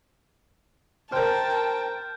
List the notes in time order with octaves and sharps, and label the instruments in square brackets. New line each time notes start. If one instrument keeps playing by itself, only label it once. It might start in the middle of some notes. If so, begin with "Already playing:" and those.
[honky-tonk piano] A#4 C5 [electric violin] G5 [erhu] A5 [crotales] F6 G6